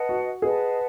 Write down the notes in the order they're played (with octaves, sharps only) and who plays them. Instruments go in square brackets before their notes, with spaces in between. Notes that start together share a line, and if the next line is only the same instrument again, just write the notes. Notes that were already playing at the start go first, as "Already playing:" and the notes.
Already playing: [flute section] B4 D#5 F#5 A5
[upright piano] F#4
[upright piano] G#4 [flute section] B4 D#5 F#5 A5